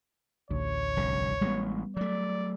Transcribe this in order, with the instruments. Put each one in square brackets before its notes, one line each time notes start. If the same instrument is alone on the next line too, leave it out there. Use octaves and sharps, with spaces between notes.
[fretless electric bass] A1 D2 [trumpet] C#5
[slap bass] F1 C2 D3
[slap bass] A1 G#3 [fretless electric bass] G3 B3
[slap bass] F#3 A3 [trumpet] D5